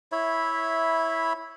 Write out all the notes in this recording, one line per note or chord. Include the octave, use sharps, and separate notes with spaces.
E4 C#5 E5 B5